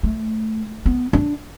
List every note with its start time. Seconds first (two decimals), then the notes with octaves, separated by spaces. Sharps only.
0.03 A3
0.86 B3
1.13 D4